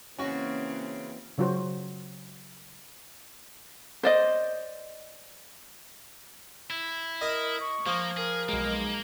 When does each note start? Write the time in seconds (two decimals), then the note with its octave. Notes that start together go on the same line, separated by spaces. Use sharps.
0.18 C#3 E3 A#3 C4 C#4 F#4
1.38 C#3 F#3 F4 F#4 C5
4.03 C5 D5 D#5
6.70 E4
7.21 A#4 D#5 D#6
7.60 C#6
7.86 F3 A#3
8.17 G#4 A#4
8.49 B1 G#3 A#3